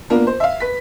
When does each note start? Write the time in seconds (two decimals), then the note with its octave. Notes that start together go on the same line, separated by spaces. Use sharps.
0.10 A#3 B3 D4 F4 A#4
0.27 C5
0.40 E5 F5
0.60 B4 B6